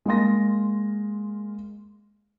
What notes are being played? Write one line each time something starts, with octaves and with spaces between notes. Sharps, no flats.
G#3 A#3 F5 C6 A#6